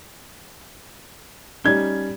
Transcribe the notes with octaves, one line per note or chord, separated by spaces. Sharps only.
G3 C#4 D#4 G#6 G7